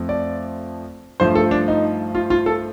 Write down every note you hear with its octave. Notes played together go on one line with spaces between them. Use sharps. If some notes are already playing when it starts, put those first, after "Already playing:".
Already playing: F2 F3 A3
D5
G2 F3 A3 C5
A4
D4
D#4
F4
F4
A4